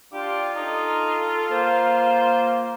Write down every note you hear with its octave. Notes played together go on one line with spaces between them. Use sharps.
D4 F4 G4
D#4 A4
A#3 C5